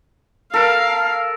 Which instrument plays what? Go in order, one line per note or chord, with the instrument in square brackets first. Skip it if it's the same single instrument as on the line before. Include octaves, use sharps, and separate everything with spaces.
[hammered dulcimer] A4 A#4 [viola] F5